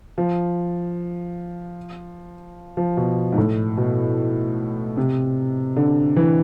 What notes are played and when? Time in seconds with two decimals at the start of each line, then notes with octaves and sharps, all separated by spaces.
0.18 F3
2.77 F3
2.97 B2
3.32 G#2
3.38 A2
3.77 B2
4.97 C3
5.77 D3
6.16 E3